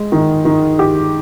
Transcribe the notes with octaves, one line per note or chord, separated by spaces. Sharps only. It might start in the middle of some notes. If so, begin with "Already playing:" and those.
Already playing: G#3
D#3
D#3
G4